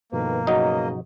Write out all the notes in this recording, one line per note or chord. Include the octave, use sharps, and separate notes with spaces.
G2 B2 D#3 F3 A#3 A4 B4
C#3 F#3 B3 D#4 D#5